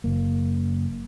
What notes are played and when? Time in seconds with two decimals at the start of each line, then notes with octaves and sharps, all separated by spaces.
0.04 F#1 A#3